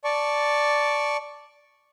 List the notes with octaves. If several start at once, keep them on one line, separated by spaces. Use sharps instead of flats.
D5 A5 C#6